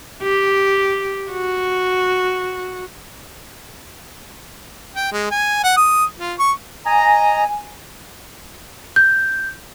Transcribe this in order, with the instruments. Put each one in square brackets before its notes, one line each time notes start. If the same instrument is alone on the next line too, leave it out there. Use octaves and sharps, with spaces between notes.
[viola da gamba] G4
F#4
[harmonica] G5
G#3
G#5
F#5
D#6
F4
C#6
[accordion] D#5 A#5 [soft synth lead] G#5
[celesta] G6